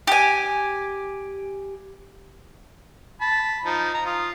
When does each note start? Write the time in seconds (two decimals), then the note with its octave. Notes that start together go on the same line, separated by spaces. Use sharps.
0.07 G4 G#5
3.21 A5 B5
3.65 F3 D#4
3.94 A#5
4.06 F4 D#6